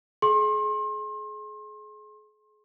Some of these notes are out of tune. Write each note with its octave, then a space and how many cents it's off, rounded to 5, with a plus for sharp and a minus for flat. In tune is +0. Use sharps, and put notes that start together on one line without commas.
G#4 +35 C6 +35